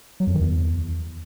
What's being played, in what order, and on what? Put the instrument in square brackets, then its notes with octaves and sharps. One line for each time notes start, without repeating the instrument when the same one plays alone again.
[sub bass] F#3
F2
D#3
E2